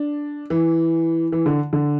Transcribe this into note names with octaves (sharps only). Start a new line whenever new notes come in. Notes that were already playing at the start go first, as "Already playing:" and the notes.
Already playing: D4
E3
E3
D3
D3